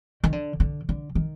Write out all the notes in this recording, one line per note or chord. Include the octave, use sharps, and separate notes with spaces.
D#3
D3
D3
D3
D#3